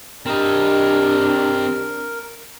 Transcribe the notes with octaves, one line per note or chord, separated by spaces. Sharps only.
C4 D4 G4 A#4 D#5